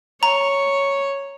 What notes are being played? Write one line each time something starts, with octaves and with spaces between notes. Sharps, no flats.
C#5 A#5